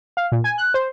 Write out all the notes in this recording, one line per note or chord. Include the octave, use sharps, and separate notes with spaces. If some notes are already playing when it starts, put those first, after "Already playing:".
F5
A#2
G#5
F#6
C5